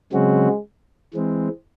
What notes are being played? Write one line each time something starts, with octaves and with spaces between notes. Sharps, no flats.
C#3 F#3 G#3 C4 F#4
E3 G#3 C4